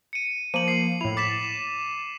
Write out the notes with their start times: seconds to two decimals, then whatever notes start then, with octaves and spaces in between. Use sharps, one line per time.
0.13 C#7 D#7
0.54 F3 A#3 D#7 F#7
0.68 C7
1.01 A2 E4 F7
1.17 D6 A6 B6 E7